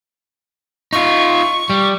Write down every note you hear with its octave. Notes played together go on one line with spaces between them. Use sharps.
D#4 F4 C#6
G3